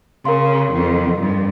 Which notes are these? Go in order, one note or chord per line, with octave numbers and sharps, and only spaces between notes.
C#3 A#4 F5 C6
F2
G2